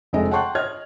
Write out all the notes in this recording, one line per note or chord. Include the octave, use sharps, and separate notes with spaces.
F1 G#3 C4 A4 D#5
F#5 G5 A5 C6 C#6 F#6
C#5 D#5 F6 G#6